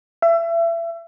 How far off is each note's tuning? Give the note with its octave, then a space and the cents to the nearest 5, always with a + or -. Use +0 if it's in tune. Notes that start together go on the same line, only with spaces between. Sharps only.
E5 +30